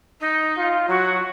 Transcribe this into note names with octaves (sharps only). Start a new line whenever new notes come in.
D#4
F4
F#3 F#4